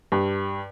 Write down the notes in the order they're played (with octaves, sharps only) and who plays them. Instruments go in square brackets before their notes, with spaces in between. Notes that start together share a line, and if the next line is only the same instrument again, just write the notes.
[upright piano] G2